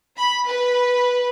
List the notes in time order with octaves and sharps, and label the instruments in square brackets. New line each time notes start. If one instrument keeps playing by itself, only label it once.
[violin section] B5
B4